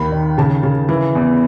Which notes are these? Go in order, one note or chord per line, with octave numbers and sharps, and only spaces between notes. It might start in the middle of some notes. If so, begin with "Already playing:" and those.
Already playing: D#2 D#3 B5
D#3
C#3 A5
C#3
E3
E2